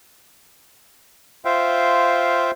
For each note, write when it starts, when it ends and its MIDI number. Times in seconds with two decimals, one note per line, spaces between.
1.45 2.51 65
1.45 2.51 72
1.45 2.51 76
1.45 2.51 77
1.45 2.51 79